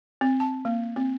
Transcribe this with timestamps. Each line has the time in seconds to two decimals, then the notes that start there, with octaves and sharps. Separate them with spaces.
0.21 C4
0.40 A5
0.65 A#3
0.96 C4